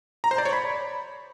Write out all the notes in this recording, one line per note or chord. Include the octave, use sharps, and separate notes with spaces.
A#5
C5
D5
C#5
B5